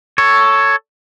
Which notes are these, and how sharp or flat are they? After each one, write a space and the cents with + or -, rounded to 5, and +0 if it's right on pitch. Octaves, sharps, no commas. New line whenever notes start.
A4 +5 C#5 +5